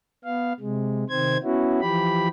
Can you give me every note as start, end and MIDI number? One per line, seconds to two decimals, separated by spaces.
0.25 0.53 59
0.25 0.53 77
0.60 1.04 48
0.60 1.04 56
1.09 1.37 48
1.09 1.37 51
1.09 1.37 60
1.09 1.37 72
1.09 1.37 92
1.43 1.80 59
1.43 1.80 61
1.43 1.80 64
1.43 1.80 66
1.80 2.28 52
1.80 2.28 53
1.80 2.28 67
1.80 2.28 83